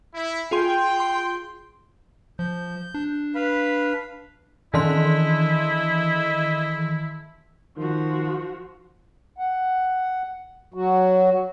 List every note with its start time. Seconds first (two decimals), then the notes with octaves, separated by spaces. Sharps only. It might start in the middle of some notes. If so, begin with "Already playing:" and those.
0.15 E4
0.51 F4 G#4 G5 C6
1.00 C6
2.39 F3 G6
2.94 D4
3.35 B4 F5 B5
4.74 D#3 E3 E4 D#5 C6
7.77 D#3 F3 F#4
9.38 F#5
10.74 F#3 F#4